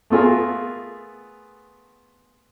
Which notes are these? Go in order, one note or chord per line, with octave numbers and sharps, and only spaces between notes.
A3 B3 F4 G#4 A#4